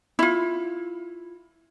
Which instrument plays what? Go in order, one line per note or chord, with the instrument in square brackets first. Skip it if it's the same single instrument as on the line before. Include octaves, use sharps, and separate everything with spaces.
[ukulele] E4 F4